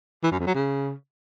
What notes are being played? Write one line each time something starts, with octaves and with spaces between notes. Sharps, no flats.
E3
F#2
F2
F#3
C#3